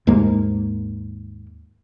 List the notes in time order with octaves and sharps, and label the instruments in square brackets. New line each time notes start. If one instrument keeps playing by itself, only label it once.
[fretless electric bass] D#2 G#2 G#3 A#3